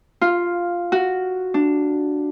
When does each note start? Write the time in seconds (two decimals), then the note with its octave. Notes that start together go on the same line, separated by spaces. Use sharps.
0.21 F4
0.92 F#4
1.54 D4